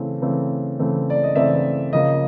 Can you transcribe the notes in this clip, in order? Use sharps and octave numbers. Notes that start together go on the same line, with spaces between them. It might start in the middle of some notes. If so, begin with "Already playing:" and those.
Already playing: C#3 E3 A3 C4
C#3 E3 A3 C4
C#3 E3 A3 C4
D5
D#5
C#3 E3 A3 C4 D5 E5
C#3 F3 A#3 D#5